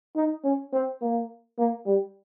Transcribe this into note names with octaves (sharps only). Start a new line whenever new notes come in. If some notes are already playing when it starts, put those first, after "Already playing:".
D#4
C#4
C4
A#3
A#3
G3